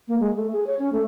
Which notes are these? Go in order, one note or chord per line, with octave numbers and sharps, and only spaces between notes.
A#3
G#3
A3
G#4
C#5
C#4
A3